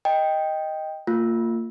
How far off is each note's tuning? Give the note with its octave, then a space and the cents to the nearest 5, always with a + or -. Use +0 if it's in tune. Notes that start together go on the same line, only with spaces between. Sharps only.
D#5 +5 G5 +5
A#3 -30 F4 +0